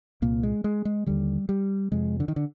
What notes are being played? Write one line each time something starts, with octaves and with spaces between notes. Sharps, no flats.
C2 A#2 A#3
G#3
G#3
G#3
D#2 D3 G3
G3
F2 C3 G#3
D3
D#3
D3